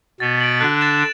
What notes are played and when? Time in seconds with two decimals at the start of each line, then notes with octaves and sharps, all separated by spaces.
0.20 B2 B3 A6
0.40 D7 F#7
0.60 D3 D4 F#6
0.81 A6 E7